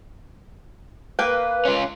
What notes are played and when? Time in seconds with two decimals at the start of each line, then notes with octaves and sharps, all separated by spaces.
1.19 A#3 B4 F5 G5
1.65 C#4 F4